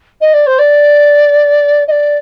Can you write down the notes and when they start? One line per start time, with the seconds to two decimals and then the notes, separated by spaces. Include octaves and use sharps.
0.21 D#5
0.34 D5
0.47 C5
0.59 D5
1.88 D#5
1.91 D5